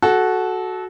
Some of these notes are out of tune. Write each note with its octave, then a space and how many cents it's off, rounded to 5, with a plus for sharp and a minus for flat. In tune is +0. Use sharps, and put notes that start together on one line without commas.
F#4 +0 A4 -20